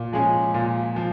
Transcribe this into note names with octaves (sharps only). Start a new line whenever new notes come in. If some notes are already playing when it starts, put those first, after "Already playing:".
Already playing: A#2
F3 G#3 C#4
A#2
F3